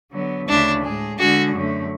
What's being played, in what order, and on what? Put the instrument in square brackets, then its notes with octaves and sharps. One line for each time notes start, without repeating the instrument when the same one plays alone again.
[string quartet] D3 F#3 B3
[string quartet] D2 C#3 E3 A3 E4 [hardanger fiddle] D4
[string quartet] A2 G#3 D4 G#4
[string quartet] D3 G#3 D4 G#4 [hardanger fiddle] F#4
[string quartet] F#2 D3 A3